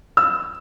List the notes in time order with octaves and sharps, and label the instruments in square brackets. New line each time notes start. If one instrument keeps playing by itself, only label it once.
[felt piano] E6